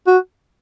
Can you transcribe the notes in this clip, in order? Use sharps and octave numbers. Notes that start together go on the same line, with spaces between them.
F#4